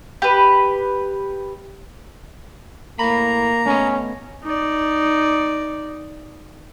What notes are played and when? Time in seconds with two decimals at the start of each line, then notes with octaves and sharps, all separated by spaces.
0.22 G4 B4
2.99 A2 A#3 A#5 B5
3.66 A3 B3 C#4 D#5
4.43 D#4 D5